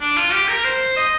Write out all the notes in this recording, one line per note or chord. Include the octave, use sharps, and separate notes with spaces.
D4
F4
G4
A#4
C5
D#5